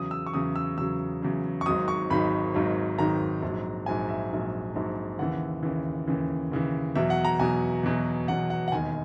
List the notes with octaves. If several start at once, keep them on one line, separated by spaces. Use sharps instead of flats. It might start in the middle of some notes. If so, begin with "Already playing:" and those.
Already playing: E2 C#3 F#3 D#6
E6
C#6
E2 C#3 F#3 D#6
E6
E2 C#3 F#3 E6
E2 C#3 F#3
C#6
G#1 G#2 D#3 F#3 D#6
C#6
G#1 G#2 D#3 F#3 B5
G#1 G#2 D#3 F#3
G#1 G#2 D#3 F#3 A#5
A#1 G#2 F#3
A#1 G#2 F#3 G#5
E5
A#1 G#2 F#3
A#1 G#2 F#3
D#2 C#3 E3 F#5
D#2 C#3 E3
D#2 C#3 E3
D#2 C#3 E3
E2 B2 F#3 E5
F#5
A#5
E2 B2 F#3 G#5
E2 B2 F#3
E2 B2 F#3 F#5
F#5
F#5
E1 D#2 D#3 G#5